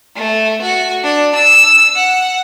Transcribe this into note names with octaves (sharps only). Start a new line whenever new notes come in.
A3
F#4
D4
E6
F#5